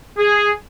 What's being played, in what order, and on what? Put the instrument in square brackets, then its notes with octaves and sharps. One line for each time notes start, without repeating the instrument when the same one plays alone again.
[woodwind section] G#4